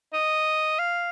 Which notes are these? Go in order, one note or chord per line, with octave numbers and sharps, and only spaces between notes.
D#5
F5